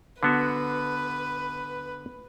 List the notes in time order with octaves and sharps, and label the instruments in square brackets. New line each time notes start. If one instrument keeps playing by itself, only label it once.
[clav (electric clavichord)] D3 B3 F#4 [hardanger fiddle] B4